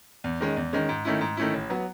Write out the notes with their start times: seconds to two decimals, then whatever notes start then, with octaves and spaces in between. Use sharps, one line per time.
0.24 E2
0.41 D#3 G#3 C#4
0.57 E2
0.73 D#3 G#3 C#4
0.89 G#2
1.05 D#3 A3 C#4 E4
1.21 G#2
1.37 D#3 A3 C#4 E4
1.54 A1
1.70 F#3 B3